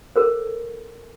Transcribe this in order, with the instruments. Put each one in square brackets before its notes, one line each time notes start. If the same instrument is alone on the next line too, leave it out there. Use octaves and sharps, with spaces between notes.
[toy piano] A4 A#4 C5